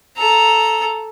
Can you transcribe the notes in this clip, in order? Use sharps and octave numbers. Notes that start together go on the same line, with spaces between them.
A4 A#5